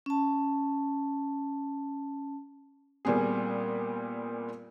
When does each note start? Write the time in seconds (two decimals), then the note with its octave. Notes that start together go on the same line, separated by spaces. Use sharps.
0.06 C#4 A5
3.05 A#2 G3 B3 C4 G#4